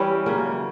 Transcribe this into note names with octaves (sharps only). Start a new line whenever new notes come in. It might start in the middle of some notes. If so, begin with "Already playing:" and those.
Already playing: E3 G3 C#4 G4
C#3 F#3 A#3